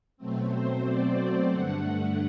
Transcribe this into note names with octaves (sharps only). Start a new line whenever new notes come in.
B2 F#3 A3 C4
C5
D5
C5
G2 D3 A3 F#5